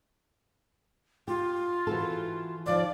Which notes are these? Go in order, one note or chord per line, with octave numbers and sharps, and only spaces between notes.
F4 G4
E3 F#4 A4
D#2 F3 D5